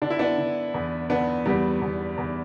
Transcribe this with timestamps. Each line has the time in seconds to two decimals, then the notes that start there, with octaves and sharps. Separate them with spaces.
0.02 D3 D4
0.10 E4
0.19 B3 D4
0.38 D3
0.74 E2
1.10 D3 B3 D4
1.46 E2 G3 B3
1.82 E2
2.18 E2